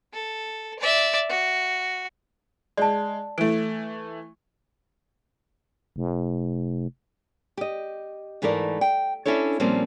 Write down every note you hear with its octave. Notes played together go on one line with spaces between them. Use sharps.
A4
D5 E5
F#4
G#3 D5 A5
E3 A3 D7
F1
G4 D#5
G#2 E3 A3 A#4 D5
G5
C#4 D4 E4 A4 C#5
A#2 F3 G3 A#3 C4 C#4